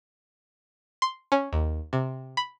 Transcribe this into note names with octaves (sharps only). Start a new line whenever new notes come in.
C6
C#4
D#2
C3
B5